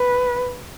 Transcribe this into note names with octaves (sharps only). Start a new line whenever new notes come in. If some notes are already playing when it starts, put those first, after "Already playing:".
Already playing: B4